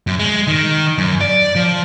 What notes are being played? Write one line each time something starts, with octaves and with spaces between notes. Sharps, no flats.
F#2
G#3
D#3
F#2
D5
F3